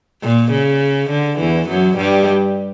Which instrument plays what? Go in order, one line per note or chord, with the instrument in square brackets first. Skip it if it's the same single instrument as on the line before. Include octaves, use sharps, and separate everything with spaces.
[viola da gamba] A#2
C#3
D3
E2 E3
F#2 F#3
G2 G3